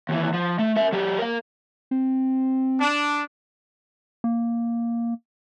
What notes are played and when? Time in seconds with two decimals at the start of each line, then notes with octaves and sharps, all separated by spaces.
0.09 D#2 E3
0.33 F3
0.59 A3
0.76 A#4 E5
0.92 F#3 G4
1.19 A#4 F5
1.91 C4
2.79 D4
4.24 A#3